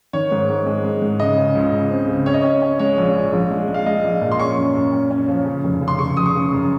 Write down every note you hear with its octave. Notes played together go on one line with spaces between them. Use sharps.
D#3 C#5
G#2
G#2
G#3
G#3
G#2
C#3 D#5
C#3
C#2
C#2
C4
C#3
C#4 C#5
D#5
C#4 C#5
C#4
G#3 C#5
A#1
A#1
A#1
G#3
G#3
F5
G#3 D#5
A#1
A#2
C6
C#4 C#6
F#2
F#2
C#4
C#4
F3
C#3
F1
C#3
C6
C#3 C#6
F1 D#6
C#6
C#3
F#2